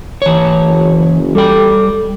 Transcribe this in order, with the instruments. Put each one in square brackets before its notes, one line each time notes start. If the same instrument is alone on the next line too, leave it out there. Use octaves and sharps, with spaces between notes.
[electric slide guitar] E3 C#5
[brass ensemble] F#1
[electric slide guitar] G3 G5 [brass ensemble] A4